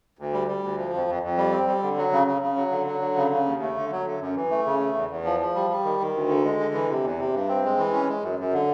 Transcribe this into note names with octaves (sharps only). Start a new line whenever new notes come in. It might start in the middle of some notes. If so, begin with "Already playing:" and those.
D2
G3
G3
D2
F3
F2
F2
F2
G3
C4
G3
D3
F#3
C#3
C#3
C#3
F#3
D3
F#3
D3
C#3
C#3
D#2
A3
D3
F#3
D3
F#2
E3
A3
C#3
A3
E2
E2
F3
F3
G3
G3
D#3
D#3
D2
D3
G#3
D3
E3
C3
E2
C3
G2
C4
G#3
E3
C#4
G#3
F#2
F#2
D3